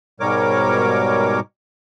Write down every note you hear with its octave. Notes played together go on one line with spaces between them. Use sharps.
G#2 B2 G3 A#4 C#5 D6